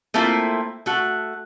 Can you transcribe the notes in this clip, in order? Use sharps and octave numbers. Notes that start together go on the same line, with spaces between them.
A3 A#3 C4 E4 F4
A3 F#4